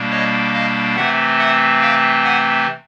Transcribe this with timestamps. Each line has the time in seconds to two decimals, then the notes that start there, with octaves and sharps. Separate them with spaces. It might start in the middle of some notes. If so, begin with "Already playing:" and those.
Already playing: B2 G3 A#3 D4
0.11 C#5 D#5
0.54 D#5 F5
0.96 C3 E3 A3 C4 E5 F#5
1.38 E5 F#5
1.81 F5 G5
2.24 F#5 G#5